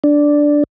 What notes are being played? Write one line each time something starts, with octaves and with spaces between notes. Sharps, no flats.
D4